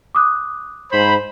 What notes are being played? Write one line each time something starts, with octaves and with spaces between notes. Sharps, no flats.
D6 D#6 F#6
G#2 C5 B5